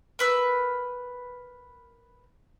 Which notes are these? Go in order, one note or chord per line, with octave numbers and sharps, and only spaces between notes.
A#4 B4 E6